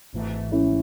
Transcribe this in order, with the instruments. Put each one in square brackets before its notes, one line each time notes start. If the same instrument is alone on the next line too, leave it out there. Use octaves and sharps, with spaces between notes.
[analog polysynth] G#1 G#2 E3 A3
[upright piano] C#4 E4